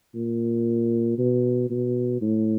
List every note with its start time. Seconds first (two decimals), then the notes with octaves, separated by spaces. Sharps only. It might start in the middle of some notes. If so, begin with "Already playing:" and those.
0.15 A#2
1.19 B2
1.70 B2
2.21 A2